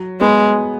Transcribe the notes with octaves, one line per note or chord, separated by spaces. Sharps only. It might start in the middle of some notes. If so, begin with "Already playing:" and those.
Already playing: F#3
G#3 B3